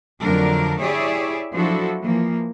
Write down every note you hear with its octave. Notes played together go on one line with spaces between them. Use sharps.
F2 D3 F#3 A3 D4 A#4
E4 G4 G#4 C#5 D5 E5
F3 F#3 D4 E4 F#4 A4
E3 F3 A#3